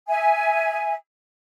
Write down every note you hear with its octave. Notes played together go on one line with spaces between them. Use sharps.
E5 G#5